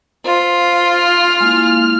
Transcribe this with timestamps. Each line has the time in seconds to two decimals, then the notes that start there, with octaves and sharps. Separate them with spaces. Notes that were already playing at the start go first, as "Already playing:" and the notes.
0.25 F4 C5
0.92 F6
1.40 G#3 A#3 E4